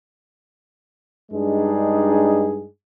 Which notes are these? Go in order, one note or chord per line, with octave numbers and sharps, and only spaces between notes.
G2 G#3 D4 D#4 G#4